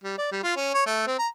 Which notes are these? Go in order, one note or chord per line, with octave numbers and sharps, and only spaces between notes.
G3
D5
G3
F4
C#4
C#5
A3
C4
A#5